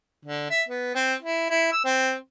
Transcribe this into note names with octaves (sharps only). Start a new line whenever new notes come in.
D3
E5
B3
C4
E4
E4
E6
C4